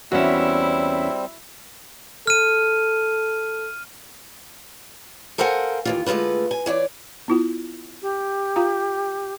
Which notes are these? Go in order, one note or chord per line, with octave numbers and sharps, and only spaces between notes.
E2 G3 C4 C#4 E4 F#4 E5
A4 F6 D#7
A4 A#4 C5 F5 F#5 G#5
D#2 E3 F4
D3 G#3 A3 F4 B4
G#5
E3 C#5 D5
B3 E4 F4
G4
F4 F5 A#5